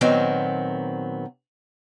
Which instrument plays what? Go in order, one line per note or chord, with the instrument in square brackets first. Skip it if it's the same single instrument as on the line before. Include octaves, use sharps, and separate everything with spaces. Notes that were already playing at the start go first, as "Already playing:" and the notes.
[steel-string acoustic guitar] A#2 D#3 F#3 B3 C4